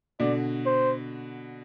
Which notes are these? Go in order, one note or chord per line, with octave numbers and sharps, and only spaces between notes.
B2 D3 D5
C5